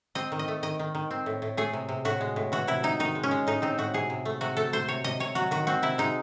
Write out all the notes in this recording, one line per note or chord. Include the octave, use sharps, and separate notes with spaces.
C4 D#5
D#3
D#5
A3
D#3 D#5
D#3
D#3
C4
A2
A2
A3 G#4
C3
C3
A2 F#4
G#3
A2
E3 F#4
C3 E4
C3 D#4
D#3 D#4
G#3
C#4
G#3
A2 D#4
C4 D#4
A2 F#4
C3 G#4
C3
A3
C3 F#4
A3 A4
A3 C5
C3 C#5
C3 D#5
C3 C#5
F#3 F#4
D#3 F#4
C4 F#4
C3 E4
G#3 D#4